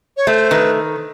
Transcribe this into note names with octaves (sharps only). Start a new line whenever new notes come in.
C#5
A3 C5
D#3 B4